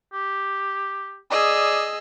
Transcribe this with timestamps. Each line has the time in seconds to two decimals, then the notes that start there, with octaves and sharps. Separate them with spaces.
0.13 G4
1.31 G#4 D5 D#5 E6